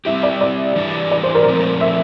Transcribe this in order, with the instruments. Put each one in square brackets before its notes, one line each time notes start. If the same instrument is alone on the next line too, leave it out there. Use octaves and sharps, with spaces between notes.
[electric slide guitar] G3 C4 E4 G4 [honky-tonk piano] E5
[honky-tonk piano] D5
D5
[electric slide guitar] E3 G3 D4
[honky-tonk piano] D5
C5
A#4
[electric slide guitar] A#2 F3 A3 C4 [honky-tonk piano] C5
[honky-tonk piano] E5